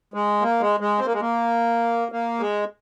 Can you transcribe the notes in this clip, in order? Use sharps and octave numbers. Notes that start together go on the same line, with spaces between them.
G#3
A#3
G#3
G#3
C4
A#3
G#3
A#3
A#3
G#3